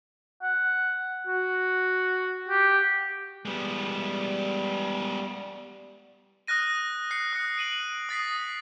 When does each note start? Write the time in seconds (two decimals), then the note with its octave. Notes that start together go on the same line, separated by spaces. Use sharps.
0.43 F#5
1.27 F#4
2.49 G4
3.45 G3 G#3 B3
6.47 D#6 F6 F#6 A#6 D#7
7.11 F#6 C7 C#7
7.33 D#6 F#6 C#7
7.58 D7 D#7 F#7
8.09 D#6 A6 B6 C7